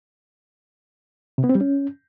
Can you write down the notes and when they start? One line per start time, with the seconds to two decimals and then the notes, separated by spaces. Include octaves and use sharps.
1.38 C3
1.44 B3
1.49 C4
1.55 G3
1.61 C#4